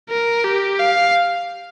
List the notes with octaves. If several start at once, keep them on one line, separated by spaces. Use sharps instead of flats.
A#4
G4
F5